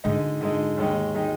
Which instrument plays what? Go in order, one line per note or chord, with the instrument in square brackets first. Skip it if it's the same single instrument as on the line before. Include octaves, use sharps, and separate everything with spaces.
[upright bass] G#2 [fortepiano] D3 G#3 D#4
[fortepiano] D3 G#3 D#4
D#2 D#3 G#3 D#4
D#3 G#3 D#4